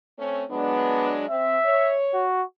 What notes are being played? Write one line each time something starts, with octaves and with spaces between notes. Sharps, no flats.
A3 C4 C#4
F#3 G#3 B3 D4
C4 E5
C#5
F#4